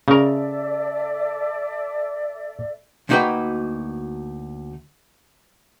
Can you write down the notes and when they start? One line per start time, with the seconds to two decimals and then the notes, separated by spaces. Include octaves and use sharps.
0.08 C#3 A4 A#4 D5 E5
3.09 D2 A#3 D#4 F#4 B4 G5